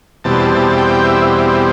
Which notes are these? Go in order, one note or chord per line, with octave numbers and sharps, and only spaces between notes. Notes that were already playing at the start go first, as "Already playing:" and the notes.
E2 B2 G3 C4 A5
A5
G5
E5